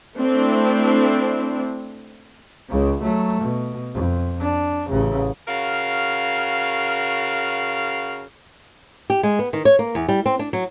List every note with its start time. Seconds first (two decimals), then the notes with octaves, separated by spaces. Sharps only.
0.18 A3 C4 D4 E4
2.69 C#2 C#3
3.02 F#3 A3
3.41 B2
3.93 F2
4.40 D4
4.89 A1 C#3
5.48 C#3 F#4 A#4 F5
9.10 G4
9.23 G#3
9.39 B3
9.53 D#3
9.65 C#5
9.79 A#3
9.95 E2
10.08 G3
10.26 C4
10.39 D4
10.53 F#3